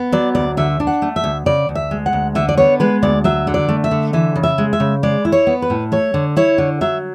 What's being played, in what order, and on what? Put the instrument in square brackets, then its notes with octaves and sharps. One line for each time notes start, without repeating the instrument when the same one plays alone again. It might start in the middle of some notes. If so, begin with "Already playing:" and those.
Already playing: [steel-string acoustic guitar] B3
F#3 D5
D2 D5
D3 E5
D4
F#5
A3
E5
D2
C#3 D5
D2
E5
G#3
F#5
D2
D3 E5
D5
B3 C#5
G#3 B4
D2 D5
F#3 E5
D3
D5
A3
E5
D3
E3 E5
C#3
E5
G#3
E5
C#3
G#3 D5
E4
C#5
B3
B4
A2
A3 C#5
D3
E4 C#5
D3
F#3 E5